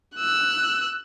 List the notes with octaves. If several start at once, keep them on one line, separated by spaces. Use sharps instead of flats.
E6 F#6